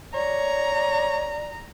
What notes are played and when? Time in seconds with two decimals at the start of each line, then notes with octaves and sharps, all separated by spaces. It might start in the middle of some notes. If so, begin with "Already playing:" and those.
0.14 C#5 D5 A#5